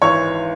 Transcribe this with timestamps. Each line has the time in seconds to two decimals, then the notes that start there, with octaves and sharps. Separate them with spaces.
0.02 G#1 G#2 E3 C#5 C#6